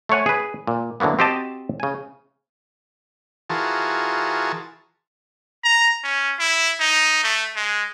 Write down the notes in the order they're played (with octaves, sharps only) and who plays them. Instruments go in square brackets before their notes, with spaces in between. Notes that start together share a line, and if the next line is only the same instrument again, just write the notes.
[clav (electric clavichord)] A3 C5 C#5 F#5 G#5
G#4 B4
A#2
D3 E3 F#3 A#3 B3
C4 F#4 G4 C5 D#5 A5
C#3 G#5
[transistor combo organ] E3 F4 F#4 G#4 A#4 A5
[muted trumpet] A#5
C#4
E4
D#4
A3
G#3